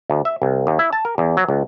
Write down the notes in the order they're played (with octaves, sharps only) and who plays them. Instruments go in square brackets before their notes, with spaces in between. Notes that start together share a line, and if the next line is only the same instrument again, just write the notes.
[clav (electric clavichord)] D2
E5
C2
D#2
E4
A5
A#4
E2
F#3
C#2